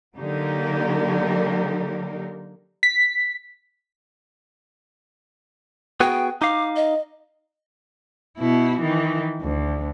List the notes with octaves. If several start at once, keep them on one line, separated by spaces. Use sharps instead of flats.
D3 F#3 A#3 D#4 G4 A#4
B6
B3 F#4 G#4 G5
D#4 F5 D6
D#5
B2 E4
D#3 E3
D2